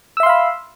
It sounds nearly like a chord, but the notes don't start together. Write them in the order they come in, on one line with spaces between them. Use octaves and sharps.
E6 E5 C6 F5 B5